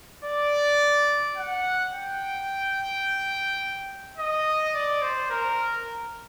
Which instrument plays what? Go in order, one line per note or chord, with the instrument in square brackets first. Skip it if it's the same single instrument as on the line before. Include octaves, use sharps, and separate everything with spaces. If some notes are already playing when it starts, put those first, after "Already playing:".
[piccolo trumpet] D5
F#5
G5
D#5
D5
C5
A#4